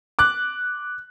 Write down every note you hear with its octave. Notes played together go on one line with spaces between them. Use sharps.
D6 F#6